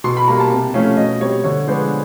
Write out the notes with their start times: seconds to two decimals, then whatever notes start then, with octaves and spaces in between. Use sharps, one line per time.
0.04 B2 C6
0.17 B5
0.28 G3 A#3 A#5
0.40 A5
0.50 C3 A5
0.74 F3 A3 C#4 F5
0.97 B2 D#5
1.20 G3 C4 C#5
1.44 D3 C#5
1.67 F3 G#3 B3 D4 C5